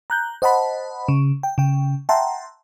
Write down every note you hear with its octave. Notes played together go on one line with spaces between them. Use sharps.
A#5 F#6 G6
C5 D#5 F#5 A5 B5
C#3
G5
C#3 G5
E5 F#5 G5 A5 A#5 C6